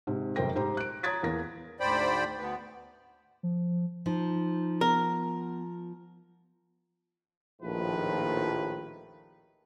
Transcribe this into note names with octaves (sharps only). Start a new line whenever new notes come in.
G#2 C3
F1 F#2 A#4 C5 G5 A#6
G#2 G4 C5 A#5
F#6 D7
C#5 A#5 D#6 G#6 A6 B6
E2 A#3 A#6
D2 G#2 C5 D5 G5 B5
D2 B3
F3
F3 D#4
B3 A#4
A#1 D#2 A2 D#3 F3 B4